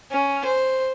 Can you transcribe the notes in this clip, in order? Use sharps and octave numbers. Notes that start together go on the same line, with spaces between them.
C#4
C5